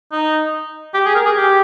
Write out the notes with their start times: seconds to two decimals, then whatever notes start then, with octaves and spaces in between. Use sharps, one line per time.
0.12 D#4
0.94 G4
1.06 G#4
1.15 A#4
1.26 G#4
1.36 G4